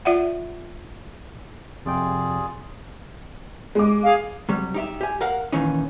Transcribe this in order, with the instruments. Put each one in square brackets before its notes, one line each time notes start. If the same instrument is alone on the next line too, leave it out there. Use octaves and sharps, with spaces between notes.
[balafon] F4 D5 E5 F#5
[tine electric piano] F2 C3 G5 [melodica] F4 G#4 D5
[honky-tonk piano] G#3 D6
[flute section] G#4 F5
[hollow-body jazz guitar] C3 F#3 G3
D#4 G4 E5
G4 G#5
A#4 F5 F#5
A#2 D#3 E3 C#4 D#4